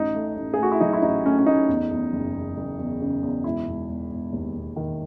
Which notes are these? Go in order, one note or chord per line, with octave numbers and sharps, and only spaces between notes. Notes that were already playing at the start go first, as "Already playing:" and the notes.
Already playing: A1 D#4
A3
A1
G#4
A3 F#4
E4
F#3 D#4
E4
A1 D#4
A3 C#4
C#4
A3 D#4
E2
E2
F#1
E2
F#1
E2
C#3
E2
E1 E4
E1
E1
E1
D#2
E1
D#3